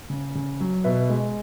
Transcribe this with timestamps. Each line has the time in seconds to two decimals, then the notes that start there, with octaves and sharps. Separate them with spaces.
0.10 C#3
0.35 C#3
0.61 F#3
0.84 B2 B4 E5
1.10 G#3